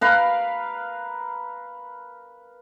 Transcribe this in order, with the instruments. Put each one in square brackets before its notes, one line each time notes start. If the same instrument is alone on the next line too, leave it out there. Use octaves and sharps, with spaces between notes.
[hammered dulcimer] A#4 B4 F5